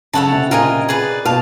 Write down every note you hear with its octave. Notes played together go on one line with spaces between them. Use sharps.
C#3 A4 C#5 F#5 A5
C3
A#2 F4 A#4 D#5 G#5
G#4 B4 D5
B2 F5 A5